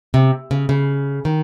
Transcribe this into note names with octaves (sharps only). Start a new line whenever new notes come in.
C3
C#3
C#3
D#3